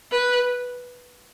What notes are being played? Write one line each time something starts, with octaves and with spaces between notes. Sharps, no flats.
B4